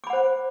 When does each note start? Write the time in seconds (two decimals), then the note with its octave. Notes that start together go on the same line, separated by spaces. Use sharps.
0.04 D6
0.07 B5
0.10 F#5
0.13 C5